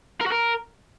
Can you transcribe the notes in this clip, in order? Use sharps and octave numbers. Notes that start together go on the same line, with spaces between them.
A#4
F#4
A#4